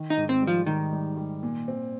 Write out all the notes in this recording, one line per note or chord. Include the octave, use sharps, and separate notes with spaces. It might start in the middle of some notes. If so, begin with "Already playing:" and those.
Already playing: D#3
D#4
G#2
C4
G3
F3
G#2 D#3
G3
G3
A#2
C4